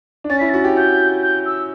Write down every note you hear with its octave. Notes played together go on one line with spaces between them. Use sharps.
D4
C#4 A6
E4 B6
F#4 A6
G4
F#4 G6
G6
E6